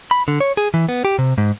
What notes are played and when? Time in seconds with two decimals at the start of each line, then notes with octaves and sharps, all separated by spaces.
0.11 B5
0.28 D3
0.40 C#5
0.57 G#4
0.74 E3
0.89 B3
1.05 G4
1.19 C3
1.38 G#2